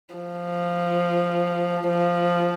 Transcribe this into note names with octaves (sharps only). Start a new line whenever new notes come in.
F3
F3